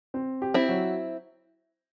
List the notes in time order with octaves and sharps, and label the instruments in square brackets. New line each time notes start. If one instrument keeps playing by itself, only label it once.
[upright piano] C4
G4
[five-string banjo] C4 E4
[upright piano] F#3